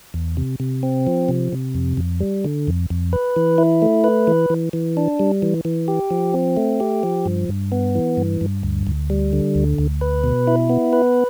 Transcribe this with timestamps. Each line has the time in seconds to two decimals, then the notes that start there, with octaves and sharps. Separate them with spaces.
0.14 E2
0.37 C3
0.60 C3
0.83 C4
1.07 F3
1.29 C3
1.53 C3
1.75 F2
1.97 F2
2.20 G3
2.45 D3
2.68 F2
2.90 F2
3.13 B4
3.36 E3
3.58 E4
3.82 A3
4.04 B4
4.27 E3
4.50 E3
4.73 E3
4.97 D4
5.20 G3
5.42 E3
5.65 E3
5.88 G4
6.11 F3
6.34 C4
6.57 A3
6.80 G4
7.03 F3
7.26 G2
7.49 G2
7.72 B3
7.95 E3
8.17 G2
8.41 G2
8.63 D2
8.87 D2
9.10 G3
9.33 D3
9.55 D2
9.78 D2
10.01 B4
10.24 B2
10.47 E4
10.70 B3
10.93 B4